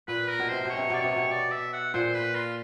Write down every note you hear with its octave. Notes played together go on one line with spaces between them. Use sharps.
A#2 B4
A#4
B2
C3 C5
B2 C#5
C3
B2 D5
C3 C#5
B2
D5
E5
F#5
A#2 C5
B4
F4